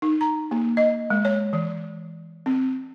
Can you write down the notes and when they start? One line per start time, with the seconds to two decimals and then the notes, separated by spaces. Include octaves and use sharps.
0.02 D#4
0.21 A#5
0.51 A#3
0.77 D#5
1.10 G#3
1.25 C#5
1.53 E3
2.46 C4